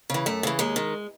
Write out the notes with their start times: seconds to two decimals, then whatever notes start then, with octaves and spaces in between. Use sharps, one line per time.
0.10 C#3 E3
0.26 F#2 A3
0.43 C#3 E3
0.59 D#2 G#3
0.76 D#3